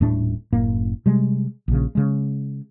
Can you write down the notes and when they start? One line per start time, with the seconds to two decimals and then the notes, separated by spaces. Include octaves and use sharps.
0.01 D#1 A2 A3 D4
0.52 F#1 A2 A#3
1.06 C3 G3 G#3
1.68 A#1 C#3
1.95 C#3 G#3